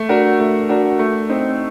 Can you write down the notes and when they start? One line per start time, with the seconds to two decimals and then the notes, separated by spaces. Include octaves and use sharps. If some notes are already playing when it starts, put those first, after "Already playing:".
Already playing: A3
0.09 D4 F#4 A#4
0.39 A3
0.69 D4 F#4 A#4
0.99 A3
1.29 C4 D#4